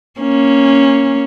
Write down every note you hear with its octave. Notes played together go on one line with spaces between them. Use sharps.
A#3 C#4